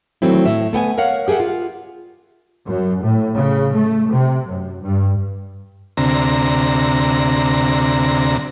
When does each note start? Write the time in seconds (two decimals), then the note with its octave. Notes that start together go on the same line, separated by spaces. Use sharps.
0.22 D#3 E3 F#3 A3 C4 E4
0.46 A2 E5
0.73 A3 B3 G5 G#5
0.98 A#4 C#5 F5 F#5
1.28 G4 G#4 A#4 E5 F#5
1.40 F4
2.67 F#2
3.03 A2
3.35 C#3
3.75 A3
4.11 C3
4.47 F#2
4.82 G2
5.97 D2 C3 A#5